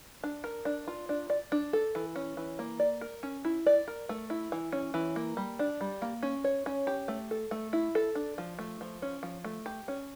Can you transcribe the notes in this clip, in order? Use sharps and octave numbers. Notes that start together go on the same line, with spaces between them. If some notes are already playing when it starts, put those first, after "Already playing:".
D4
A#4
D4
F4
D4
D5
D4
A4
E3
C#4
E3
A#3
D5
A#4
C#4
E4
D5
A#4
A3
E4
E3
C#4
E3
A#3
G3
D4
G3
A#3
C#4
C#5
C#4
G4
A3
A4
A3
E4
A4
D4
F3
A3
F3
C#4
F3
A3
G4
C#4